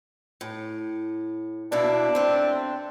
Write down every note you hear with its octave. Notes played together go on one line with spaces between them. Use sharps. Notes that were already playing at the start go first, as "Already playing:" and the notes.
A2
B2 A#3 D4 E4
A3 C4